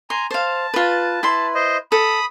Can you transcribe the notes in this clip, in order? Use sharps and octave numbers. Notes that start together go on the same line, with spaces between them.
G#5 A#5 C6
C5 F5 A5
F4 B4
E4 B4 C6
C5 D#5
A4 B5 D#6